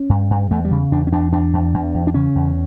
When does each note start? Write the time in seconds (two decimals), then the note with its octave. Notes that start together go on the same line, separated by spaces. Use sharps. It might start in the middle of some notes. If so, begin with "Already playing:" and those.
Already playing: C#4
0.09 G2
0.30 G2
0.51 E2 A3
0.65 G3
0.71 C#3
0.92 E2 D4
1.07 C#4
1.12 E2 D4
1.32 E2 D4
1.53 E2
1.74 E2
1.94 E2
2.07 D4
2.14 C#3 C#4
2.35 E2